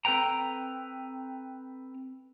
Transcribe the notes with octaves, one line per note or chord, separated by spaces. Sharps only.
C4 A4 B4 G5 A#5